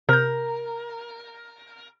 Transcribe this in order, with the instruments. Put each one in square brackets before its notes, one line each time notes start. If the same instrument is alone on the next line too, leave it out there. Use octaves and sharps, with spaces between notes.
[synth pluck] C3 G6 [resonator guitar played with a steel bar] A#4